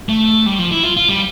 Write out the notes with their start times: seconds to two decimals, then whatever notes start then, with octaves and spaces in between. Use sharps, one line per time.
0.09 A3
0.46 G3
0.59 F3
0.72 E4
0.83 F4
0.97 F4
1.09 G3